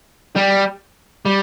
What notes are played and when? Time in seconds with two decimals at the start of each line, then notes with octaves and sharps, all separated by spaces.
0.36 G3
1.26 G3